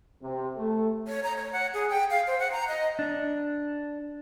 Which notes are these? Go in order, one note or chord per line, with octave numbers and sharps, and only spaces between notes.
C3
A3
C#5
A#5
C#5
F#5
G#4
G5
F5
C5
F#5
A#5
D#5
D4